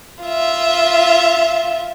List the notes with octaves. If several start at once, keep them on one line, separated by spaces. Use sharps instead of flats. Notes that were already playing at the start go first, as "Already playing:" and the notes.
F4 E5